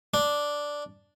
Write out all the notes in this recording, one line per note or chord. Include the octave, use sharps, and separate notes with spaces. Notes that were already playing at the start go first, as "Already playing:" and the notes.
D4